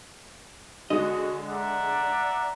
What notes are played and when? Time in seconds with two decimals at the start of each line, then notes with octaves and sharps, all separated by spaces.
0.90 D3 G#3 F#4 D#5 D#6
1.48 D5 E5 F#5 A#5